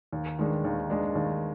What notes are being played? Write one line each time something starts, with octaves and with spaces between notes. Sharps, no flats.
D#2
D#3 G#3 D4
D#2
D#3 G#3 D4
D#2